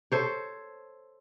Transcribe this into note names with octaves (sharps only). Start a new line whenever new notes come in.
A4 C5 C#5